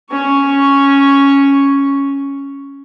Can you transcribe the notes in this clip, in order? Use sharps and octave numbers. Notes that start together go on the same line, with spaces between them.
C#4 C#6